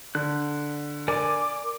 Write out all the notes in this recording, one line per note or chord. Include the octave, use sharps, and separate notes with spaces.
D3 F#6
A#4 D5 G#5 D6